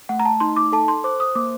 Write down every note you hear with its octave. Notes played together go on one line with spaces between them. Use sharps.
A3 F#5
A#5
A5
D#4 C6
D6
A4 A5
C6
C5 D6
D#6
A#3 D6